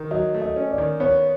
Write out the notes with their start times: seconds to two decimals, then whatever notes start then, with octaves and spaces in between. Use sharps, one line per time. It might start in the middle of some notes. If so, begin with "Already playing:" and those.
Already playing: D#3
0.11 F#3 D#5
0.34 A3
0.42 D#5
0.56 C#4
0.71 D5
0.78 D#3
1.00 B3 C#5